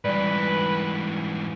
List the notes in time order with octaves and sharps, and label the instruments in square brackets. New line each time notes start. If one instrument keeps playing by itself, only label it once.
[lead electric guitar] G#2 E3 [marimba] G3 D5 [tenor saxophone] B4